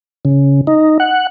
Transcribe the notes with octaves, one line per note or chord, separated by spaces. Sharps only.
C#3
D#4
F#5